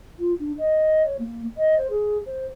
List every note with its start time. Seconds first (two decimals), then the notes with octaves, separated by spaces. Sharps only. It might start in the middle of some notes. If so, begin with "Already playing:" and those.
0.19 F4
0.39 D4
0.58 D#5
1.05 C#5
1.19 A#3
1.57 D#5
1.77 C5
1.90 G#4
2.26 C5